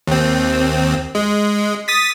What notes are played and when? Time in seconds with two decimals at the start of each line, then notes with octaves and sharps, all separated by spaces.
0.07 D#2 C4
1.15 G#3
1.88 D#6 A6 B6